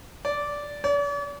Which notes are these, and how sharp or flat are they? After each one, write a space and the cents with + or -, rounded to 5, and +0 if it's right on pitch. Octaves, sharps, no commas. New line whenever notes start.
D5 -10
D5 -45